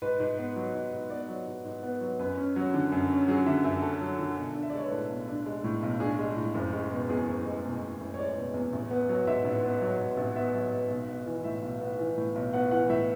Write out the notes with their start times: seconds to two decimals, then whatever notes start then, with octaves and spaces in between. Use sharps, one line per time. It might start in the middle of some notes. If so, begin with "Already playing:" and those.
0.02 G#2 B4
0.20 G#2
0.38 B3
0.56 F#3
0.75 G#2
0.92 G#2
1.10 B3 D5
1.29 F#3
1.47 G#2
1.65 G#2
1.83 B3
2.01 F#3
2.19 F#2 B4
2.37 C#4
2.56 F#3
2.74 D3
2.92 F#2
3.10 C#4
3.28 F#3 G#4
3.46 D3 E5
3.64 F#2 E5
3.83 C#4 A4
4.01 F#3
4.19 D3
4.37 B1
4.55 D4
4.63 E5
4.70 D5
4.74 G#3 C#5
4.84 B4
4.91 A2 A4
5.10 B1
5.28 D4
5.46 G#3
5.64 A2
5.83 B1
6.00 D4 G#4
6.19 G#3
6.37 A2
6.54 F#1
6.73 G#3
6.91 B2
7.09 E2 G#4
7.27 F#1
7.45 G#3
7.64 B2
7.82 E2
8.00 F#1
8.14 C#5
8.18 G#3 D5
8.36 B2
8.54 E2
8.73 A1
8.91 B3
9.09 F#3
9.27 G#2 E5
9.45 A1
9.63 B3
9.81 F#3
10.00 G#2
10.17 A1
10.36 B3 E5
10.54 F#3
10.72 G#2
10.90 B1
11.08 B3
11.26 E3
11.44 A2 E5
11.62 B1
11.81 B3
11.99 E3
12.17 A2
12.36 B1
12.53 B3 F#5
12.71 E3 F#5
12.89 A2 E5